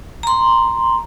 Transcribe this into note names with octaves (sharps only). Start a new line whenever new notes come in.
A#5 C6